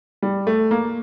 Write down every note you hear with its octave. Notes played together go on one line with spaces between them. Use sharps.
G3
A3
A#3